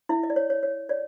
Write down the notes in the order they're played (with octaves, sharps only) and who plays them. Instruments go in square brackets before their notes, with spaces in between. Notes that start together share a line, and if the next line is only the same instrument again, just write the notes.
[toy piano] E4 E5
D#5
D5
C#5
C#5
C#5
C#5 D5